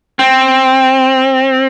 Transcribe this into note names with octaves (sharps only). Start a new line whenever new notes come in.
C4